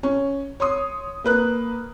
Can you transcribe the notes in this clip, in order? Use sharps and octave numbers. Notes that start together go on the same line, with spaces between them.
C#4
C#5 C6 D#6
A#3 B4 F#6